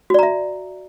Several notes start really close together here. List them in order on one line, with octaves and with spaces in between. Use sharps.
F#4 D5 A#5 E5